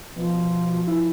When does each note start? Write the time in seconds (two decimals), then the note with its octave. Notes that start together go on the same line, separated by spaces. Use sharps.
0.16 B2 F3
0.87 E4